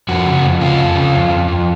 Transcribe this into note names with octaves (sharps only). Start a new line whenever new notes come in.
F2 F#4
C#3
F2
C#3 F4
F2
C#3
F2
F2
F2